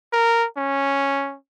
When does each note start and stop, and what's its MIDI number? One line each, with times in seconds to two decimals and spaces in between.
0.13 0.46 70
0.57 1.36 61